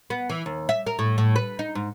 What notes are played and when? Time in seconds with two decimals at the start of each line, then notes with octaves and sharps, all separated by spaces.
0.10 B3
0.30 E3
0.46 D#2
0.69 E5
0.87 A#4
0.99 A2
1.18 A2
1.36 B4
1.59 D#4
1.75 G#2